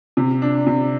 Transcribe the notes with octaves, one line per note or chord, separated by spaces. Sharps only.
C3
D4
C3